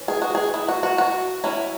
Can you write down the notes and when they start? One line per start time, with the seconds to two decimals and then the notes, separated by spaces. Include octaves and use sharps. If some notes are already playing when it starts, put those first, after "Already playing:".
Already playing: E3 C#4
0.08 G#4
0.22 F#4
0.35 G#4
0.54 E4
0.69 F#4
0.83 F#4
0.98 F#4
1.44 F#3 C#4 E4